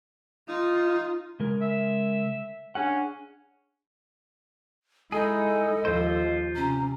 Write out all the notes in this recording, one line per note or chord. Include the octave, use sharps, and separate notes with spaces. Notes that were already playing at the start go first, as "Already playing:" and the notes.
D#4 F4
C#3 G#3 A#4
E5
C#4 D4 G#4 F#5
G#3 D#4 E4 G#4 A4 D#5
D#2 F3 F4 C5
C3 C#4 A#5